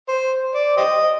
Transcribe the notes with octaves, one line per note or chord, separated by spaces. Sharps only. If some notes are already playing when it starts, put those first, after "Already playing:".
C5
D5
G4 C5 D#5